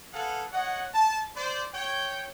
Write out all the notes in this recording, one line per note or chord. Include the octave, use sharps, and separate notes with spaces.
G#4 A4 B4 F5 F#5
C#5 D#5 F#5
A5
C5 D5
C#5 G5